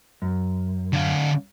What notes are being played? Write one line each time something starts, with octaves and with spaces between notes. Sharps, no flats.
F#2
D3 F5